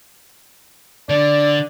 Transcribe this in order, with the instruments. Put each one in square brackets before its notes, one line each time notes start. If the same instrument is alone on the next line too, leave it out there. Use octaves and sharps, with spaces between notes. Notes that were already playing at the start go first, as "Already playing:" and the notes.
[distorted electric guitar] D3 [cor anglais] D5